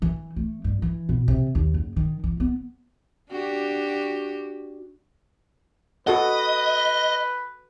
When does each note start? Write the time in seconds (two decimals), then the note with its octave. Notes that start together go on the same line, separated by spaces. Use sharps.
0.02 E3
0.36 A3
0.64 G2
0.82 E3
1.09 B2
1.28 C3
1.55 D#2
1.74 F#1
1.96 D#3
2.24 E3
2.40 B3
3.30 D4 F#4 G4
6.07 F#4 A4 B4 D#5 F#5